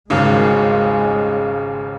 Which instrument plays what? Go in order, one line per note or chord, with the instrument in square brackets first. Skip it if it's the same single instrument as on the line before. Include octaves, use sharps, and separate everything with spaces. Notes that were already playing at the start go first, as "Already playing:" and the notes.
[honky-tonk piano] G#1 D#2 C#3 [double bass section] G#3